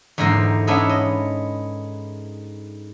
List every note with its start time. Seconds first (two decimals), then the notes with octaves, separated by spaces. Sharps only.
0.18 E2 G#2 D3 A#3 A#4 C5
0.67 G#3 B3 C#4 D4 E4 G#4
0.89 D#5